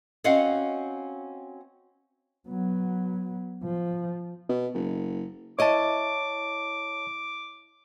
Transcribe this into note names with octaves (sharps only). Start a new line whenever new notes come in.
C4 C#4 F#4 D#5 F5 F#5
F#3 B3
F3
B2
F#1
E4 C#5 D#5 A5 D6